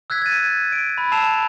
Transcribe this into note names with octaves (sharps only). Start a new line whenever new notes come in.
E6 F#6 G#6 B6
G#6 A6 D#7
D7
B5
A5 E6 C7 E7 F7